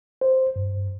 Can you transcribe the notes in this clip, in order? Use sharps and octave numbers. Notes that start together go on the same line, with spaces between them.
C5
G2